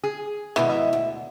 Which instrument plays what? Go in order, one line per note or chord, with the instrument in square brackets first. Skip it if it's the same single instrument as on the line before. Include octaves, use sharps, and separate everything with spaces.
[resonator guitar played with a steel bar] G#4
[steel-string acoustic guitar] G#2 B2 D#3 [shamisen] E3
[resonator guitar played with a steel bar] E5
[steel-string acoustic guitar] D2